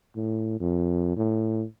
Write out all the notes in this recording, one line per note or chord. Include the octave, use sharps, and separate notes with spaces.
A2
F2
A2